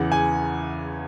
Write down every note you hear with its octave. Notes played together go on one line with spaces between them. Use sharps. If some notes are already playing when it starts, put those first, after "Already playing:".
Already playing: E2 C#3 E3 F#5
G#5